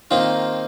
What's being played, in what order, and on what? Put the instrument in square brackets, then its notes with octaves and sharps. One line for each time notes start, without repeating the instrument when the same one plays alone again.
[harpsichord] D#3 A#3 F4 [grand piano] C4